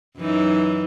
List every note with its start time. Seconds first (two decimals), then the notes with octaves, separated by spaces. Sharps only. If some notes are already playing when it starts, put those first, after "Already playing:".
0.17 F#2 E3 D#4